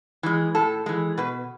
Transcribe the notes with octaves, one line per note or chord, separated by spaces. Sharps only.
E3 G#3
A2 A4
E3 G#3
B2 B4